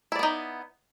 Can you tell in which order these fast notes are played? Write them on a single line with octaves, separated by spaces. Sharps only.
E4 D5 B3 D#4